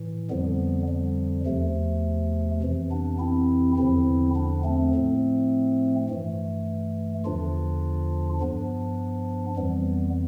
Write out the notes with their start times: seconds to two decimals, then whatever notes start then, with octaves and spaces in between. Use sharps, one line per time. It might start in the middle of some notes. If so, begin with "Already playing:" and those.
Already playing: A2 E3
0.30 F2 D3 F3 G3 B3
0.89 G3
1.46 E2 C3 F3 A3
2.63 F2 C3 E3
2.91 B3 D4
3.19 C4 E4
3.77 E2 D3 F3 C4 E4
4.35 B3 D4
4.64 A3 C4
4.94 A2 F3
6.09 G2 E3 A3
7.25 E2 D3 F3 D4 F4
8.41 G2 F3 B3 D4
9.57 F2 E3 G3 B3